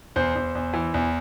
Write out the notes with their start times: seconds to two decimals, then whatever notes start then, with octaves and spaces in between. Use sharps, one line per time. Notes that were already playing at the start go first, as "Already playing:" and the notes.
0.16 E2 C5
0.36 E2
0.55 E2
0.73 E3
0.94 E2